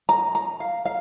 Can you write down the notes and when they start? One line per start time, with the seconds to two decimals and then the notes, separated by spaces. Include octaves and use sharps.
0.09 A#5
0.35 A#5
0.60 F5
0.85 F5